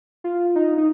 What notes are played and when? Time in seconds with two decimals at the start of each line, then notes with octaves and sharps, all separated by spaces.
0.24 F4
0.55 D#4
0.78 D#4